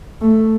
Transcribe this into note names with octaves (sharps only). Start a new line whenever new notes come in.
A3